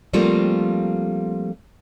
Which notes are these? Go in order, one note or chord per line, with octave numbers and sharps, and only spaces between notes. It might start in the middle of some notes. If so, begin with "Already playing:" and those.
F3 G3 A3 A#3 C4 F4